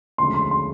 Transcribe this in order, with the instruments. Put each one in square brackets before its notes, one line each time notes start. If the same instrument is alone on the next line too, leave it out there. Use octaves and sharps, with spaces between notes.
[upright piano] E1 D2 C#3 F3 G#3 [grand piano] C6
[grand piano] C6
C6